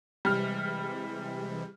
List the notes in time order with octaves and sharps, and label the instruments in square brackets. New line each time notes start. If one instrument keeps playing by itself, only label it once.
[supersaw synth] C3 E3 G#3 [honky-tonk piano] G3 F6